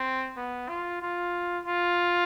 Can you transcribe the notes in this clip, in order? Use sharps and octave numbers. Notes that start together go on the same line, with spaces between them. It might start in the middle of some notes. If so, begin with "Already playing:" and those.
Already playing: C4
B3
F4
F4
F4